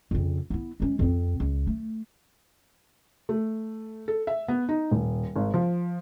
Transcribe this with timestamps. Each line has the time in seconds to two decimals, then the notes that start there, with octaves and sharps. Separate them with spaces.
0.11 F2 C#3
0.50 B3 E4
0.80 G#3 C#4
0.99 F2 C4
1.40 C#2
1.67 A3
3.29 A3
4.08 A4
4.27 E5
4.48 B3
4.69 D#4
4.91 D#1
5.36 G#1
5.54 F3